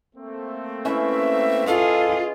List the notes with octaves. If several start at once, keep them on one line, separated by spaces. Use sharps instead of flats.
A3 A#3 C4
C#4 E4 B4 E5
F4 G#4 A4 D#5 F5